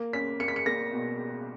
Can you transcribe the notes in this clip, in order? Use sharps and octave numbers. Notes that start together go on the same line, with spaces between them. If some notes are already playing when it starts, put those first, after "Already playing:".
Already playing: A#3
C#4 B6
A#3 C#7
B6
C#7
A#3 A#6
B2